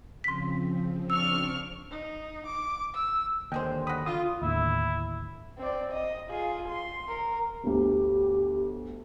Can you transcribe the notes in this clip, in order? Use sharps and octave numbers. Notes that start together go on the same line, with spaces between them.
C#3 F3 C4 C6 B6
D4 C#6 E6 F6
D#4
D6
E6
D#2 D3 G#3 G#4 C5 G5
F#4 B5 D#6
D3 F4 D#6
D#2 A2 D3 E4
C4 D5
D#5
F4 G#4
C6
A#4
G1 D2 G4